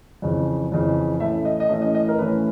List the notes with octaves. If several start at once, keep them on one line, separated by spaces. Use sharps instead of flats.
F2 C#3 E3
F2 C#3 E3
A2 E3 A3 C#4 E5
D#5
D#5
A2 E3 A3 C#4 E5
D#5
D#5
A#4
A2 E3 A3 C#4 B4